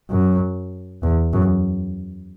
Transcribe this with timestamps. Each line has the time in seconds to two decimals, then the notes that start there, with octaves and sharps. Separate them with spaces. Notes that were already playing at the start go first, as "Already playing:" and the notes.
0.10 F#2
1.03 E2
1.33 F#2